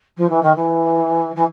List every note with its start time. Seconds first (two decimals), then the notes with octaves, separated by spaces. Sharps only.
0.17 F3
0.29 E3
0.42 D#3
0.55 E3
1.36 E3